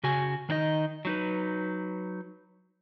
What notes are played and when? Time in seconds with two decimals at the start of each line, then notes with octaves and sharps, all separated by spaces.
0.03 C#3 F#4 G#5
0.49 D#3 D4 D#4 D#5
1.05 F#3 D#4 B4